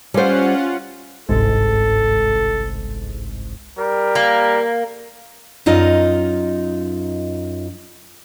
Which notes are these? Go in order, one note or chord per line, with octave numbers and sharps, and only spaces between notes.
G3 C#4 F4 C5 F#5
G1 C2 G#2 A4
G3 A#4
A#3
F#2 D#4 F4 D#5